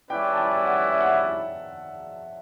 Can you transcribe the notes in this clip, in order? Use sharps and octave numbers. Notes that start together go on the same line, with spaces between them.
G3 C#4 E4 B4 D5 G5
A5
G5
F#5
E5
F#5
E5